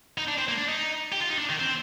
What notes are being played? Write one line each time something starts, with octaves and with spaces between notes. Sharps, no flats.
D#4
D4
C4
A#3
D4
D#4
G4
F4
D#4
D4
D#3
C4